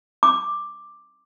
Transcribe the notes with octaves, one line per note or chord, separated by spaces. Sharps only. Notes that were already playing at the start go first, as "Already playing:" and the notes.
D6